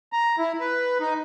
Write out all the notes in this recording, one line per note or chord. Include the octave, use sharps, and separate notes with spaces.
A#5
E4
B4
D#4